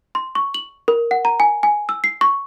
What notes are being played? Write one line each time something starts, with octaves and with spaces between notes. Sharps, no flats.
C6
C#6
F#7
A#4
F#5
A#5
G#5
G#5
E6
C7
C#6